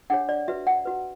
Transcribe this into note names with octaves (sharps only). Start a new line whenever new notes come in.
D4 G#4 C#5 F#5
D5
F#4 B4 E5
F#5
F#4 B4